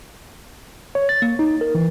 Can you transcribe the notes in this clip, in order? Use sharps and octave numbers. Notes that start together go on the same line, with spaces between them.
C#5
A6
A#3
D#4
A#4
E3